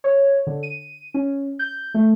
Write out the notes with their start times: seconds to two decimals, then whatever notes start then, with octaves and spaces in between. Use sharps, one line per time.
0.04 C#5
0.47 D3
0.63 D#7
1.14 C#4
1.59 G6
1.94 A3